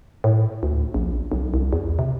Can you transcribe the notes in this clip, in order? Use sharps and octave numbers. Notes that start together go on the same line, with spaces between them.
A2
D2
A#1
B1
C2
E2
C3